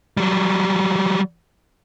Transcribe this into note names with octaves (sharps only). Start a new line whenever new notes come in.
F#3 G3